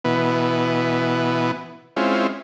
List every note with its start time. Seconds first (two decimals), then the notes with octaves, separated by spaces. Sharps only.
0.05 B2 E3 B3
1.96 G#3 C4 C#4 E4 F4